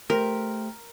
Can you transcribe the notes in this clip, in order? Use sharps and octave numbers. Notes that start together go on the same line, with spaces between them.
A3 G4 A#4 C5